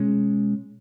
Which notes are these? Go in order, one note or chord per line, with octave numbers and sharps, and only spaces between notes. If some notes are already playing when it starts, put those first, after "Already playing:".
Already playing: B2 G#3 C#4